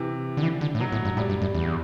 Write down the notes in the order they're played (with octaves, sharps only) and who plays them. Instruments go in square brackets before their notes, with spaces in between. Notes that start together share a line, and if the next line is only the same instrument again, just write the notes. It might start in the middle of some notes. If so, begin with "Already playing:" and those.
Already playing: [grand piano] C3 E3
[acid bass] D3
E3
D3
A2
[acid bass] B2 [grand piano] F#3
[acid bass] A2
G2
[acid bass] A2 [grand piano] G3
[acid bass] G2
F#2
E2